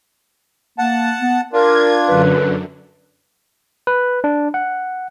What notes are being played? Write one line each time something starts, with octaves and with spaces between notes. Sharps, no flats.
A#3 F#5 A5
B3
D4 F4 A#4 G#6
F#2 D3 B4
B4
D4
F#5